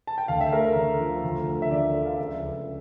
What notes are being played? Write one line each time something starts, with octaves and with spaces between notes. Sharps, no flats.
A5
G5
D2 F5
E5
A3 A#4
A#4
D3
F3
D2
D2
E5
D3 D5
F3 E5
F5
C#2 E5
C#2